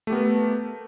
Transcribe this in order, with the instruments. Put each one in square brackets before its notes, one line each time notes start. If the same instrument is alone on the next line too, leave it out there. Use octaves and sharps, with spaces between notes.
[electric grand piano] A3
G4
B3
A#4